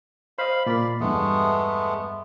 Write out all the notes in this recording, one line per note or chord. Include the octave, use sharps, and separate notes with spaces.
C5 D#5 F5 B5
A#2 A#3 D5 B5
E2 G2 G#3 A3 B3